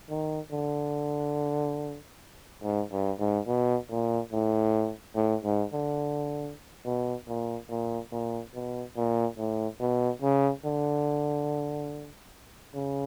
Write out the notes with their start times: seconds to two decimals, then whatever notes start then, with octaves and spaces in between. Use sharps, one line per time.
0.10 D#3
0.52 D3
2.63 G#2
2.92 G2
3.19 G#2
3.47 B2
3.90 A#2
4.33 A2
5.16 A2
5.45 G#2
5.73 D3
6.85 B2
7.28 A#2
7.70 A#2
8.12 A#2
8.54 B2
8.97 A#2
9.38 A2
9.80 B2
10.22 C#3
10.65 D3
12.75 C#3